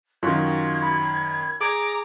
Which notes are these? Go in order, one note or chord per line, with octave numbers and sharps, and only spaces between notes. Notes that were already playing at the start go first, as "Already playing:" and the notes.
F#2 D#3 F4 F#4 G#6
B5
G#4 A#5 D6 G#6